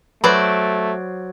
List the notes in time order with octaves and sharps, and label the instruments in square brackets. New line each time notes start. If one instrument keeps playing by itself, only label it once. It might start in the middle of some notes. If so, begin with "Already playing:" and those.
[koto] F#3 C5 D5 [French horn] A3 [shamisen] B4